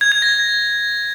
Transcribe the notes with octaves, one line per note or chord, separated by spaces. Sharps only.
G#6
G#6
A#6